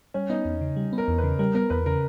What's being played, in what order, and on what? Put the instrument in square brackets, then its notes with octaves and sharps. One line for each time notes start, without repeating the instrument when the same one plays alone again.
[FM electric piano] G3 [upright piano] C#4
[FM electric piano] B3 [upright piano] D#4
[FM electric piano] E2
C#3
G3
B3
[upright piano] A#4
[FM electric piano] E2
[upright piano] B4
[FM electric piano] C#3
[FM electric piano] G3 [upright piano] A#4
[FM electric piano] B3 [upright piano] A#4
[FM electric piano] E2 [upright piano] B4
[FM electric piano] C#3 [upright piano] A#4